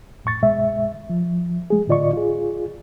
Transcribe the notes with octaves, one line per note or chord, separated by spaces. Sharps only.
F2 A2 C#6 A6
C2 G2 B2 G#3 E5
F3
F3 G#3 G#4
A2 D3 F4 D5 D#5 C#6
F4 G#4